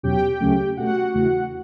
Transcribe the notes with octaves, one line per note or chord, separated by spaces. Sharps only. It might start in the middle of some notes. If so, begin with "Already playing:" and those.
E2 B2 F#3 C#4 G4 G5
D2 C#3 F#3 A3 C#4
B2 A3 C#4 F#4 F#5
E2 C#3 E3 A3